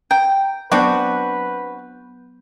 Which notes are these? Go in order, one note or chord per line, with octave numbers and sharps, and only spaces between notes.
G5 A#5
F#3 B3 C4 D4 F#4 B4 G6